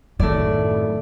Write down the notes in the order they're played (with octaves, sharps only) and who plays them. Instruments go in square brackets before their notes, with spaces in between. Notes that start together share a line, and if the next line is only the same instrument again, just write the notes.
[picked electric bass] F#2 A2 D#3 [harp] A3 D5 [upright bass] E4